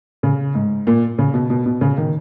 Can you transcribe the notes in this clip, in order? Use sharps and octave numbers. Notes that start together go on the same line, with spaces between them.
C#3
G#2
A#2
C#3
B2
B2
B2
C#3
D#3